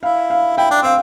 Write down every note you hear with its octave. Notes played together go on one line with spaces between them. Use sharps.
E4 F5
F5
E4 G5
D4
C4 F5